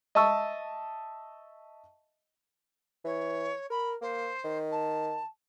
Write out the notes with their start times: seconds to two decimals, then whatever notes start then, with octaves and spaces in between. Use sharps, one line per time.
0.15 D#5 E5 A5 C#6 E6
3.05 E3 C#5
3.70 A#4 B5
4.01 A#3 C5
4.45 D#3
4.71 A5